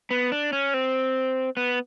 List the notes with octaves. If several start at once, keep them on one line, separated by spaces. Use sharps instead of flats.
B3
D4
C#4
C4
B3